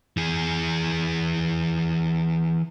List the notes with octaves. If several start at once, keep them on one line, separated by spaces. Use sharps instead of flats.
E3 G#4